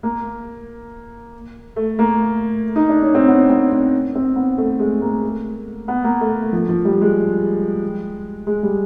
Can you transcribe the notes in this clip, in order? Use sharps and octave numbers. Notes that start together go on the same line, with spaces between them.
A#3
A3
A#3
D#4
D4
C#4
C4
B3
C4
C4
C4
B3
A3
G#3
A#3
B3
A#3
A3
F3
F3
G3
G#3
G#3
G3